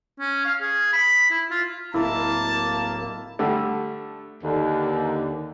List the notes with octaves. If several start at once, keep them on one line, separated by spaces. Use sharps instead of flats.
C#4
F5
G#4
B5
E4
F4
D1 A#3 E4 A5
D3 G3 A3
D#2 D3